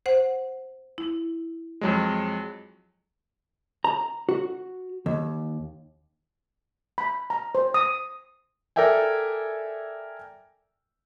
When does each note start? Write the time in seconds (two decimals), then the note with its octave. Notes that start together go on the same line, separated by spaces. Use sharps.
0.06 C5 F#5
0.98 E4
1.81 F2 F#3 G#3
3.84 A#5
4.29 F#4
5.06 D#2
6.98 B5
7.30 A#5
7.55 C5
7.74 D#6
8.76 A4 A#4 D5 E5 G5 G#5